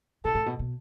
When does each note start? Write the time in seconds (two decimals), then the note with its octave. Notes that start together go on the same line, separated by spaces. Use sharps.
0.25 B2 A4
0.35 A2
0.46 B2
0.59 B2